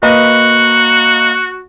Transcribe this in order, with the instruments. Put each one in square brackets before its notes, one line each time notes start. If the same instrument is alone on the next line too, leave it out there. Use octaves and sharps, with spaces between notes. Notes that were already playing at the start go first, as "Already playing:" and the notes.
[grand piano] A#3 B4 D#5 [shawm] F#4